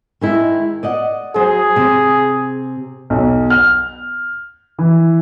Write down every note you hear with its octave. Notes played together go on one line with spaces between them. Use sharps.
D#3 G#3 E4
D5 D#5 F#5
F#3 G#4 C5
C3
B1
F6
E3